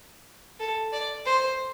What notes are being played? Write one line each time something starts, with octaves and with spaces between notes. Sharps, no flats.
A4
D5
C5